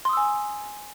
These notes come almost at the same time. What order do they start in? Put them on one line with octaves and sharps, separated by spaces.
C6 D#6 E6 G#5